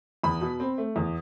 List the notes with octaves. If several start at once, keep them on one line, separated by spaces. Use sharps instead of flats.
E2 B5
B2
C4
A3
E2